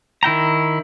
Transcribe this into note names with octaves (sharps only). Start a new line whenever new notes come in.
D#3 E4 G5 A#5